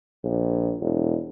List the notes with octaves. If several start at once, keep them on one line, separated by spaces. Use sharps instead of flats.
A#1
E1